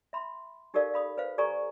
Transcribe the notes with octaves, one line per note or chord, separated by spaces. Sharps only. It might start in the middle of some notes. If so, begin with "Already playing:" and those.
E5 B5 C6
D#4 G4 A4 A#4 D5 F5
F5 B5 D#6
B4 C5 F5
G4 A4 D5 G#5 A#5 C#6